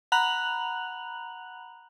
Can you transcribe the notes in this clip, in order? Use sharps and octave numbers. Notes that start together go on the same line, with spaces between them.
F#5 A#5 B5 F#6 F7 F#7